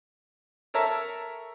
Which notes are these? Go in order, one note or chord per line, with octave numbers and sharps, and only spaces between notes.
A4 A#4 C#5 E5 A5 A#5